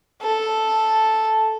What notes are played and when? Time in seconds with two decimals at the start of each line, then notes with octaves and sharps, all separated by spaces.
0.22 A4